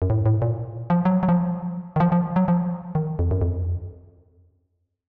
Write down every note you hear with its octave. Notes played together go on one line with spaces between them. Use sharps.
F#2
A2
A2
A#2
F3
F#3
F#3
F3
D#3
F3
F3
F#3
F3
D#3
F2
F#2
F2